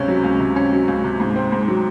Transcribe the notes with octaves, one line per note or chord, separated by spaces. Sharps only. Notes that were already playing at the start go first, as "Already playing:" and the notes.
Already playing: C#2 C3 C#4
F#3
C#2
C3
C#4
F#3
C#2
C3
G#2
C4
G#2
F#3